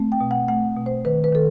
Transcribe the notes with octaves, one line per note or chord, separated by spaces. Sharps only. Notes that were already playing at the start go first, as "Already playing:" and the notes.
Already playing: A3 C4
G5
B2
F#5
A3 F#5
B2
C5
D#3 B4
B4
D#3 A4